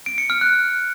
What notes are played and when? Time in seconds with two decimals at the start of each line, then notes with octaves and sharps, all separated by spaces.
0.06 D7
0.18 C#7
0.30 F6
0.41 F#6